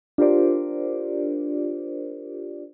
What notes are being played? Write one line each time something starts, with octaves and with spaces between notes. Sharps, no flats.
D4 F4 G4 A#4 C5 D5